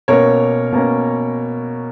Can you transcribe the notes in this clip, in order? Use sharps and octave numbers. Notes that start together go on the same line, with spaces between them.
B2 A#3 C#4 A#4 C#5
B2 A#3 C#4